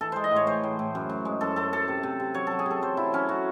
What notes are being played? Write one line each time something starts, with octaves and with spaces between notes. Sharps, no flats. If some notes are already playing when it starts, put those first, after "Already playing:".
E3 A4
G#3 C5
D#5
A2
C#5
E3 C5
A2
A2
F#2
F#2
G#3
F#2 A4
F#2 A4
F#2 A4
C3
C3
C3
F#3 C#5
F#3 A4
G#4
C3 A4
F#3 C5
F#3 E4
F#3 C#4
F#3 F#4